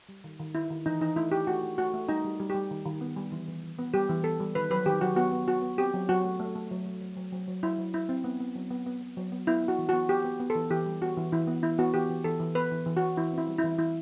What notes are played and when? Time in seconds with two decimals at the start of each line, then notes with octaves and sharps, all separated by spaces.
0.09 G3
0.24 D#3
0.40 D#3
0.55 D#3 E4
0.71 D#3
0.86 E3 D#4
1.01 E3 D#4
1.16 A3 E4
1.32 E3 G4
1.47 A3 F#4
1.63 A3
1.78 A3 F#4
1.94 A3
2.09 G3 D#4
2.24 G3
2.40 G3
2.50 G4
2.55 G3
2.71 D#3
2.86 D#3
3.01 B3
3.16 G3
3.32 E3
3.48 E3
3.63 E3
3.78 B3
3.94 G3 G4
4.09 E3
4.24 B3 A4
4.40 G3
4.55 D#3 B4
4.70 F#3 B4
4.86 D#3 G4
5.01 F#3 F#4
5.16 B3 F#4
5.33 B3
5.47 B3 F#4
5.62 B3
5.78 C4 G4
5.94 F#3
6.09 F#3 F#4
6.25 A3
6.40 A3
6.55 A3
6.71 F#3
6.86 A3
7.01 F#3
7.17 F#3
7.32 F#3
7.48 F#3
7.63 F#3 E4
7.78 F#3
7.94 F#3 E4
8.09 C4
8.24 B3
8.40 B3
8.56 F#3
8.71 B3
8.86 B3
9.01 B3
9.17 F#3
9.32 B3
9.47 B3 E4
9.63 B3
9.68 F#4
9.79 E3
9.89 F#4
9.93 B3
10.09 B3 G4
10.24 B3
10.40 B3
10.50 A4
10.55 E3
10.70 E3 G4
10.86 G3
11.02 B3 F#4
11.17 E3
11.32 E3 E4
11.48 B3
11.63 E3 E4
11.79 B3 F#4
11.94 E3 G4
12.09 E3
12.24 E3 A4
12.40 E3
12.55 B3 B4
12.71 E3
12.86 E3
12.97 F#4
13.02 E3
13.17 E3 E4
13.33 C4
13.38 E4
13.48 G3
13.58 E4
13.64 E3
13.79 E3 E4